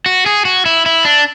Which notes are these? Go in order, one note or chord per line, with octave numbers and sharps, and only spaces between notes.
F#4
G#4
F#4
E4
E4
D4